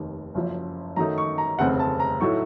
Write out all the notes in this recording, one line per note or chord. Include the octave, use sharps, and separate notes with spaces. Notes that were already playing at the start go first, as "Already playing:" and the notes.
Already playing: F1 D#2 D#3
F#1 F#2 F3
F#2 D#3 F#3 A3 D#4 A#5
C#6
A#5
F1 D#2 C#3 A3 C4 F#5
A5
A#5
A2 F#3 A3 D#4 C#6